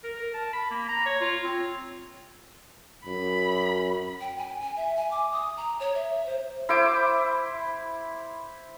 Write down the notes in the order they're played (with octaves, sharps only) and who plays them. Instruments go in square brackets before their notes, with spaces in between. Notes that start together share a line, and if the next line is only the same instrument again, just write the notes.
[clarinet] A#4
A#4
A5
B5
A#3
A#5
C#5
F4
C4
[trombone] F#2 [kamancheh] B5
[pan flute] G5
G#5
G#5
E5
G#5
D6
D#6
A#5
C#5
E5
C5
[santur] E4 C5 D6